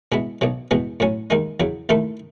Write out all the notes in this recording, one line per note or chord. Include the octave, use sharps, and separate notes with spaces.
B2 G#3 B3 E4
B1 B2 F#3
E2 B2 G#3 B3
A2 F#3 C#4
D#2 D#3 G#3 D#4
E2 C#3 F#3
D#2 D#3 A3 E4 A4